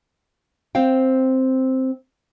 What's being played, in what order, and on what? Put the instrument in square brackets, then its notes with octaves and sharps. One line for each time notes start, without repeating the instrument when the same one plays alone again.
[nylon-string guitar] C4 C5 F5 G5